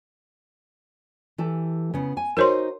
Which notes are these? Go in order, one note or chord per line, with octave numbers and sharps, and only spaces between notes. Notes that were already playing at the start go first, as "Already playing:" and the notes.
E3 G4 A4
C#3 B3
G#5
D#4 F#4 A#4 C5 C#5 C6